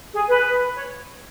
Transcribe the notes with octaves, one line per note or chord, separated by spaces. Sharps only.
G#4
B4
C#5